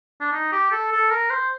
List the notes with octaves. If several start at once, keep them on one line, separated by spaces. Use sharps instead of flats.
D4
D#4
G4
A4
A4
A#4
C5